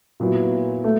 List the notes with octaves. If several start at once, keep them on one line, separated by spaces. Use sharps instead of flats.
A#2 F#3 B3 E4
A3